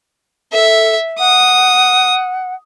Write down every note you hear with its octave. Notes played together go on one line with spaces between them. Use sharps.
A4 E5
F#5 D#6